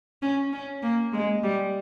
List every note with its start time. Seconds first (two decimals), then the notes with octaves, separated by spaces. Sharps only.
0.22 C#4
0.52 C#4
0.83 A#3
1.13 G#3
1.43 G3